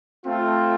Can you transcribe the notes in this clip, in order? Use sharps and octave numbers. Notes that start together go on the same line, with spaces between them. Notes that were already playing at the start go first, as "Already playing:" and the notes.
A3 C4 F4